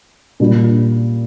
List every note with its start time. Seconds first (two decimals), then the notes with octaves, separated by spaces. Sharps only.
0.40 A#2 G3 D4